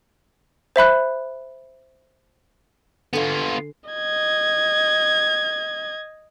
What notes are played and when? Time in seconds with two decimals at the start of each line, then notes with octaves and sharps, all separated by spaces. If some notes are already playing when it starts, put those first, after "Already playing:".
0.76 C5 E5 B5 F#6
3.13 D3 B3 F4 G#5
3.90 D#5 G#6